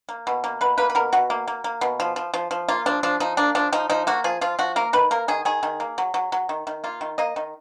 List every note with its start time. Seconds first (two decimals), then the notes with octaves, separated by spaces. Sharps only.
0.09 A#3
0.27 B2
0.44 A#3
0.61 B2 B4
0.78 A#3 B4
0.90 B4
0.95 B2 A#4
1.13 B2 F#4
1.30 A#3
1.48 A#3
1.64 A#3
1.81 B2
2.00 F3
2.16 F3
2.34 F3
2.51 F3
2.68 A#3 F4
2.86 F3 D4
3.03 F3 D4
3.20 F3 D#4
3.37 A#3 D4
3.55 F3 D4
3.72 F3 D#4
3.90 F3 D#4
4.07 A#3 F#4
4.24 F3 G#4
4.41 F3 F4
4.59 F3 F#4
4.76 A#3 A#4
4.93 D#3 B4
5.11 A#3 A#4
5.28 D#3 G#4
5.45 D#3 G#4
5.63 D#3
5.80 A#3
5.98 F#3
6.14 F#3
6.32 F#3
6.49 D#3
6.67 D#3
6.84 A#3 F4
7.01 D#3
7.18 A#3 D#5
7.36 D#3